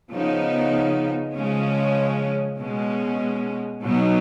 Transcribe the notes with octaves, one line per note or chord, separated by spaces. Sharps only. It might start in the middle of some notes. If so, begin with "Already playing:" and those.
C#3 F3 B3 D#4
C#3 F3 G#3 C#4
B2 G#3 C#4
B2 F#3 B3 D#4